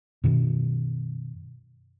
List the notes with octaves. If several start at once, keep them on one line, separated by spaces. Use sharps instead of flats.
F#2 B2 D#3